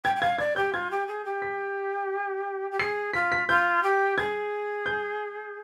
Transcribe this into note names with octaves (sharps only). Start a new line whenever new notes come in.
G5 G#6
G5
F5 G#6
D5 G#6
G4 G6
F4 G#6
G4
G#4
G4
B6
G4
G#4 C7
F4 B6
B6
F4 G6
G4
G#4 G#6
G6